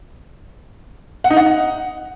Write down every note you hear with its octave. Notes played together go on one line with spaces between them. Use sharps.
F#5
D#4
F#5